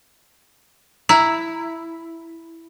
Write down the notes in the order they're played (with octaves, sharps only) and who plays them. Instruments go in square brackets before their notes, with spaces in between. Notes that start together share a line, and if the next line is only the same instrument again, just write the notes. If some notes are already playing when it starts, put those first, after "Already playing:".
[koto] E4 [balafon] A#5